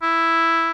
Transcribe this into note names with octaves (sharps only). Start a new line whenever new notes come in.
E4